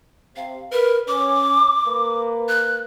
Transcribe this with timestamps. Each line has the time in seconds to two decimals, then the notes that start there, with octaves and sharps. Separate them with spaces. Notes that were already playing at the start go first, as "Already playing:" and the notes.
0.36 C3 F5
0.72 A#4 B4
1.08 C#4 D6
1.86 A#3 B4
2.48 F#6